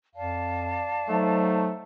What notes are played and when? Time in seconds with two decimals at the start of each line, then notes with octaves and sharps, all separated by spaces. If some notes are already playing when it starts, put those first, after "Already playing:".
0.15 F2 D5 F5 A5
1.09 F#3 A3 D#4 C5